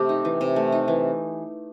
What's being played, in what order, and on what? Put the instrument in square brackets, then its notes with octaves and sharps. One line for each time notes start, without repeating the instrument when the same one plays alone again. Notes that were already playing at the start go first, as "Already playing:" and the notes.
Already playing: [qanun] C3 A3 [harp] G4
[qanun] D#4
E3
C3
A3
D#4
E3